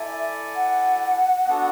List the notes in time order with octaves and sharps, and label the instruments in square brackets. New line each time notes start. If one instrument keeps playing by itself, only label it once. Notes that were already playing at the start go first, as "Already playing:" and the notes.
Already playing: [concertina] E4 A4 D5 G#5 [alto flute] E5
[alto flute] F#5
[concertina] B3 D4 F#4 A4